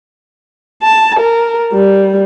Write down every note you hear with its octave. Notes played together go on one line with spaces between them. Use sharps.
A5
A#4
G3